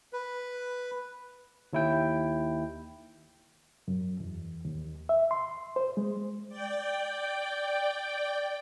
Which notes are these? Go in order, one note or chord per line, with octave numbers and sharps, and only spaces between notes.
B4
D#2 E4 G5
F#2
E2
D#2
E5
C6
C5
G#3
D5 G5